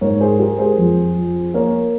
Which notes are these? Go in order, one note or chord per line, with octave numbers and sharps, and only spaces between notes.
G#2 A#4 C#5
G#4 C5
G#3 G4 A#4
G#4 C5
F2
F3
A#3 A#4 C#5